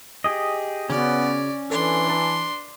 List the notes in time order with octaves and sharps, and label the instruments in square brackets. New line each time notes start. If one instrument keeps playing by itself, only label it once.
[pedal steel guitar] G4 G#4 D#5
[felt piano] C#3 F#4 [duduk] B3 [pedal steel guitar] C#4 [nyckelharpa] D5
[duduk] E3 [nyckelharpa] D4 C6 [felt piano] A4
[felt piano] B4 A5